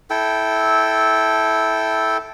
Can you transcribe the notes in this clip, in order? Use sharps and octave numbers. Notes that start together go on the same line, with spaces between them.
E4 A4 G5